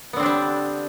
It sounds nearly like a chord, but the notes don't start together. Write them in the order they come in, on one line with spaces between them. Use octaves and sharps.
B3 D3 C4 D4 G3